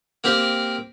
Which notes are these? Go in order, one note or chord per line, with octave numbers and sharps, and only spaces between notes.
A#3 C4 G4 A#4 C5